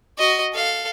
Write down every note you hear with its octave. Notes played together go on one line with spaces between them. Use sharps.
F#4 D#5
A4 F5